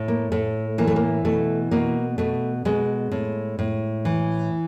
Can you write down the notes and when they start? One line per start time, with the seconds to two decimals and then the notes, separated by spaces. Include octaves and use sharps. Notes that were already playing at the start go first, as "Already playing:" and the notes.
Already playing: A2
0.08 A#3
0.32 A2 A3
0.78 E3 A#3
0.87 A3
0.96 A#3
1.25 B2 A3
1.71 B2 A#3
2.18 B2 A3
2.65 B2 G#3
3.12 A2
3.59 A2
4.05 E3